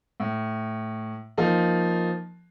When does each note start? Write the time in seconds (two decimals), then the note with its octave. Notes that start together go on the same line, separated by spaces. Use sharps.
0.20 A2
1.38 F3 A#3 D#4